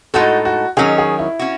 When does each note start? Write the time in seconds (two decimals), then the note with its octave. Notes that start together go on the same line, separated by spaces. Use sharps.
0.14 A2 G#3 D#4 F#4 A4
0.45 F#4
0.77 D#3 F#3 C#4 G#4
0.98 G#4
1.19 E4
1.39 C#4 F#4